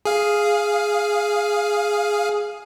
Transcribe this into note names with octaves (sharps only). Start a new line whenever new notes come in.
G#4 F5